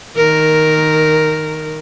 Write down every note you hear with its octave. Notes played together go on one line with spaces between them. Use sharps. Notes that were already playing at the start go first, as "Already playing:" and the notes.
D#3 A#4